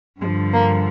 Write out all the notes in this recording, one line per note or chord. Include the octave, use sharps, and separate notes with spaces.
G2 D3 F3 G#3
A#3